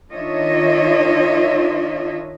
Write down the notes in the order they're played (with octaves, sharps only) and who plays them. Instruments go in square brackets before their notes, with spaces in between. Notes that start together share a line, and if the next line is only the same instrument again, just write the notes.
[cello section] D#3 D4 F4 C#5 D#5 E5